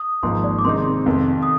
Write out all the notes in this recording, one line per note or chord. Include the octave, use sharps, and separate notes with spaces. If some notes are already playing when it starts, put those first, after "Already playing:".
Already playing: D#6
G#1 G#2 F3 A#3 C6
D5
D6
C3 D#3 G#3 C4 D#4 C6
F2 C3 D#3
D#6